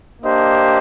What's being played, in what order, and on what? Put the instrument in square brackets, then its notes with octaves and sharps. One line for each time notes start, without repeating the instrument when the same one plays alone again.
[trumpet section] A#3 D4 G4 C5 D#5